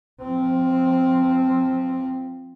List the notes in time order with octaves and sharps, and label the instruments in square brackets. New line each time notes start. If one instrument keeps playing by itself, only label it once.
[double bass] F3 C4